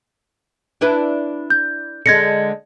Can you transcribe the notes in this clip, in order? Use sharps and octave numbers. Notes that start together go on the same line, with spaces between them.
D4 E4 B4
G6
D3 G#3 G#6 A#6 C#7